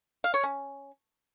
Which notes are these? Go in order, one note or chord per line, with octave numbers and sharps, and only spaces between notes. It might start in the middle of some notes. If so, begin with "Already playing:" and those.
F5
C#5
C#4